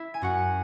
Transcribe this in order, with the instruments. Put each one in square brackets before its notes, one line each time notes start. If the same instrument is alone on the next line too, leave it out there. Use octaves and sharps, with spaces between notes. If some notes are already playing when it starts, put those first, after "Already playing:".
Already playing: [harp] E4 E5
G#5
F#2 F#4 F#5